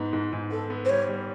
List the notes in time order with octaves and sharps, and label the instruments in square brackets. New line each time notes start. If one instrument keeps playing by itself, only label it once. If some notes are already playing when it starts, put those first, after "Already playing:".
Already playing: [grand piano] G#2 B3
G#2
G#2
[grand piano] B3 [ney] A4
[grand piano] B3
[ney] C5
[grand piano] G3 [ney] C#5
[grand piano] G3